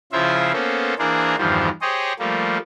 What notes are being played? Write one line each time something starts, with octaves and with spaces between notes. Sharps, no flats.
C#3 F3 E4 F4 C5 E5
A#3 B3 C#4 A4 C5
E3 A#3 D4 G#4 A#4 C5
E2 G2 D#3 F3 G3 C5
G4 G#4 C5 C#5 D#5
F3 G3 A3 A#3